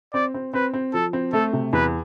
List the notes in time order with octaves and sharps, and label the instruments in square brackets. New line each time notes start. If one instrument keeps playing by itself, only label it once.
[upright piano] C4 [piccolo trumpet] D5
[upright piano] C4
[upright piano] C4 [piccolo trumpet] B4
[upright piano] C4
[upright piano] F3 [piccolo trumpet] A4
[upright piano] C4
[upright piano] A3 [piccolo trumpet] A4
[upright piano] C3
[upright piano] E2 [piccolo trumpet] B4